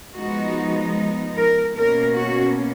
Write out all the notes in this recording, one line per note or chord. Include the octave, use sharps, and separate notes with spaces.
F3 G#3 B3 D#4 F#4
A#4
B2 A#3 C#4 A#4
F#4